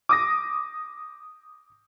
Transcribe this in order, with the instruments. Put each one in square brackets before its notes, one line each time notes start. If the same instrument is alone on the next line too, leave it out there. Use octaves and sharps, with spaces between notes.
[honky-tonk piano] D6 D#6 A#6